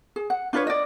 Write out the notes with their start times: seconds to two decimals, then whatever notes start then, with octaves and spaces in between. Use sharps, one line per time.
0.16 G#4
0.30 F#5
0.53 D4 F4 B4 C#5
0.67 D5 D#5